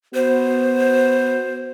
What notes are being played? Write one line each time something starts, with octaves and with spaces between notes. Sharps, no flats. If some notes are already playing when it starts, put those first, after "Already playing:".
B3 F#4 C5